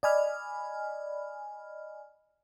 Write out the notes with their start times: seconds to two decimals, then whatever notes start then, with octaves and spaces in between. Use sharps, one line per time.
0.03 D5 D#5 G#5 B5 F6